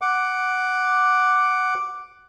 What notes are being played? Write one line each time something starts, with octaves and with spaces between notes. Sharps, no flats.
F#5 D6